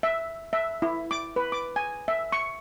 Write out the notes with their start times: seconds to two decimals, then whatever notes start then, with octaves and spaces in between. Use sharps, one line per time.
0.03 E5
0.53 E5
0.82 E4
1.11 D6
1.36 B4
1.52 D6
1.76 G#5
2.08 E5
2.32 C#6